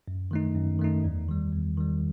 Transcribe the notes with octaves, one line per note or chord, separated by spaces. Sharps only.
F#2
D#3 A3 D#4
F#2
D#3 A3 D#4
E2
D#3 G3
E2
D#3 G3